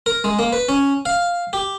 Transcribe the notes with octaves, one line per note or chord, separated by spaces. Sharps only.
A#4
G#3
A#3
B4
C#4
F5
G4